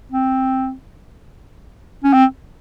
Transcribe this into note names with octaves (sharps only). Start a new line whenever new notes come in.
C4
C#4
C4